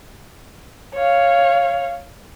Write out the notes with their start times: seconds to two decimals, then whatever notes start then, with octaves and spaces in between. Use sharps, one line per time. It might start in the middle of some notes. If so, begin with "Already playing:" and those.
0.94 C#5 F5